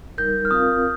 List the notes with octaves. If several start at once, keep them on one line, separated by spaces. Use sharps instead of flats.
G3 D#4 A#4 G6
F6
C4 F4 A#4 F5 D#6